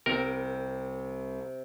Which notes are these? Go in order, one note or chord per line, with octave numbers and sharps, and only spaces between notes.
C2 C3 C4 A#4